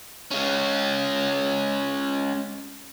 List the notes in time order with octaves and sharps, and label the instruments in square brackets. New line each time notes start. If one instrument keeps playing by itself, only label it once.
[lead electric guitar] G#3 C#4